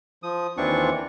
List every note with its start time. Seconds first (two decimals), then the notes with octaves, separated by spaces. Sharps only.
0.23 F3 D#6
0.57 D#2 E3 C4 D4 F4 C#6